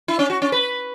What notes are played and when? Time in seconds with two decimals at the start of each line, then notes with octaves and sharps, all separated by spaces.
0.08 E4
0.19 C#4
0.30 F#4
0.42 C#4
0.52 B4